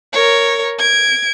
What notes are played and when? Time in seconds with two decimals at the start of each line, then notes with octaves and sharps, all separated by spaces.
0.13 A#4 C#5
0.79 G#6 D7